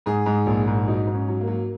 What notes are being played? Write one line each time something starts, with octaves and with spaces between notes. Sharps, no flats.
G#2 G#4
G#2
A#1
G#2
F#3 D#4
G#2
C#4
F#3
A#3
F#3